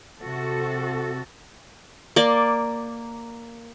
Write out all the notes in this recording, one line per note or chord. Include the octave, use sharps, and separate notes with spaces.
C3 F#4 A4
A#3 D5